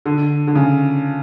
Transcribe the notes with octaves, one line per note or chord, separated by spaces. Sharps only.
D3
D3
C#3